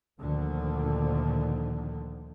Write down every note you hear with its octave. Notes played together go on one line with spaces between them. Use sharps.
D2 A#2 D3 D#3 F3